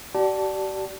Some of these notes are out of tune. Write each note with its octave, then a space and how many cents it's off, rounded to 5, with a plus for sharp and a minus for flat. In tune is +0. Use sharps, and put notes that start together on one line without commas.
G4 -45 D5 +0 A5 +0